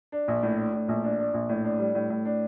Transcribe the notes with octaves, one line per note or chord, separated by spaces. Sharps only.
D4
A#1
A2
D4
A2
A#1
D4
D4
A#1
A2
D4
G3
A2
A2
D4